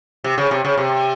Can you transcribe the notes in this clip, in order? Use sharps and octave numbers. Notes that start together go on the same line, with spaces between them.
C3
C#3
C3
C#3
C3